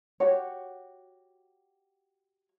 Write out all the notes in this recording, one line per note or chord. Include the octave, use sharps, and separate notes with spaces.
F#4 G4 C#5